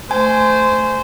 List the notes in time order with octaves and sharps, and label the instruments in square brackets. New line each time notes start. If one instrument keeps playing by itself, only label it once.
[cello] A3 [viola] C5 [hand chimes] G#5